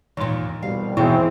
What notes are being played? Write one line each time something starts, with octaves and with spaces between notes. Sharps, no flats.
D#2 A#2 E3 C6
C2 B2 G3 F5
D#2 B2 E3 C4 E4 G#4